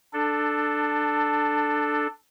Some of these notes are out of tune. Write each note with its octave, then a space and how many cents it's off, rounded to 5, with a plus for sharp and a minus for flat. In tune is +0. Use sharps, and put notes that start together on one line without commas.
D4 +15 A4 +0